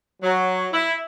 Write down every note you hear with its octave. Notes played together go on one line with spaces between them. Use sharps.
F#3
E4